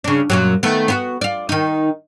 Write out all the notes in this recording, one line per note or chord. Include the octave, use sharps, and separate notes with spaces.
C#3 D4
F#2 A#2 F#3
D#3 A3 B3
B3 F4 F#4
F4 D5
D#3 D#4